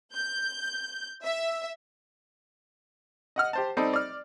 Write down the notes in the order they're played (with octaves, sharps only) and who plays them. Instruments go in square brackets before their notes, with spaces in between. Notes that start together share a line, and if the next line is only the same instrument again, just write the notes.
[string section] G6
E5
[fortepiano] D#5 F#5 F6
G4 C5 A5
G3 C4 D#4 A4
D5 F6